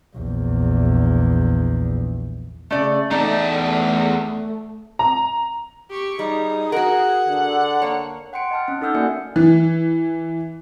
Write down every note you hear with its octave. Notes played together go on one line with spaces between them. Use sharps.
A#1 E2
C#3 A3 D5
E2 A3 D#4 D5 A5
A#5
G4 C#6
G3 D#4 G#4
F#4 A#4 F#5
D3
A#3 C#5
F#5 G5 C6 C#7 D7
D#5 A5 F6
C#4
D#4 A4 F#5 E6 F6 G6
A#3 F#4 D5 E5 G#5 C#7
E3